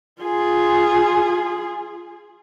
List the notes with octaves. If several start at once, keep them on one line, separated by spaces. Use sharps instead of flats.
F4 G#4